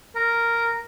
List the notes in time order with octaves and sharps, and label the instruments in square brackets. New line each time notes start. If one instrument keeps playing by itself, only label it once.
[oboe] A#4